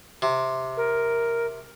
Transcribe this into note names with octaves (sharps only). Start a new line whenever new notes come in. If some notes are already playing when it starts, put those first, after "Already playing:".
C3
A#4